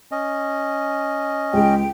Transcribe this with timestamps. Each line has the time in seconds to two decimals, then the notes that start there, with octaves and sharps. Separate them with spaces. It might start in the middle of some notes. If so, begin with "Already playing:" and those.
0.12 C#4 D#5
1.54 C#2 G#3 G5